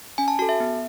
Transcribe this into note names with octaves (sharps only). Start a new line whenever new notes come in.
C#4 G#5
A5
F#4 A4 A5
E5
B3